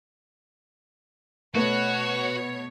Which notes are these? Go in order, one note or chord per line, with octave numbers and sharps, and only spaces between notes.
B2 A3 B3 F#4 C#5